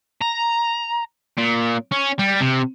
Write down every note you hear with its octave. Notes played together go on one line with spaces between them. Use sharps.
A#5
A#2
C#4
G3
C3